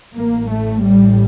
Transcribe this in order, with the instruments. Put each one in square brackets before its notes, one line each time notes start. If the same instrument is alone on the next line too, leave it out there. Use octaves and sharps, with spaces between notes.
[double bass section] A1 A2 A#3
A3
G3